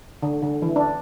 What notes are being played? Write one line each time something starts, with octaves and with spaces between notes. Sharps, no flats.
D3
D3
E3
D4